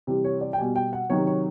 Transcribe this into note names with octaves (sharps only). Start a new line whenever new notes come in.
C3 E3 G3
C#5
D5
G5
B2 G3 G#5
G5
F#5
C3 D#3 F#3 C#5
C#5